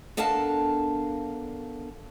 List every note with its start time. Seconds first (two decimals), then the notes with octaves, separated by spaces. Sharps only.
0.17 B3 D4 A4 A#4 F5 A5